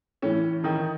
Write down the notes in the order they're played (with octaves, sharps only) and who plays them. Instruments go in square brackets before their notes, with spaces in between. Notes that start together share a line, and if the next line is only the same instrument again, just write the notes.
[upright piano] A2 E3 C#4
D#3 D#4